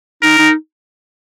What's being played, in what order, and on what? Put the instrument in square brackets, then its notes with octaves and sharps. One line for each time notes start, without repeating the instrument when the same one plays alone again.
[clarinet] D#4 [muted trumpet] A#4
[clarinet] D#4